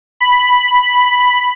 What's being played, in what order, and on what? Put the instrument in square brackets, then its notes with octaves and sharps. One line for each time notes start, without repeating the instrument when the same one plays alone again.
[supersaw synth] B5